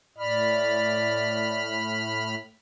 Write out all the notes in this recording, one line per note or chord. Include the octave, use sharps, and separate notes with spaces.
A2 D5 B5 F6